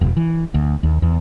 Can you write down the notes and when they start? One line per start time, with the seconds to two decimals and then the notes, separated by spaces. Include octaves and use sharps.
0.01 E1
0.17 E3
0.54 D2
0.83 D#2
1.02 E2